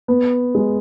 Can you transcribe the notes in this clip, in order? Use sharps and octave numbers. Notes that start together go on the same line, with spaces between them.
B3
G#3